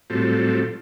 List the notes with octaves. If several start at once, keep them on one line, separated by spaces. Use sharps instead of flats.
A2 F#3 G3 C4 F4 A4